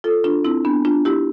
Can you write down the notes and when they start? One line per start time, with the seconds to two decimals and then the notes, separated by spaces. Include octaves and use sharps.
0.04 F4 A4
0.24 D4 F4
0.44 C4 E4
0.65 B3 D4
0.85 D4 F4
1.05 E4 G4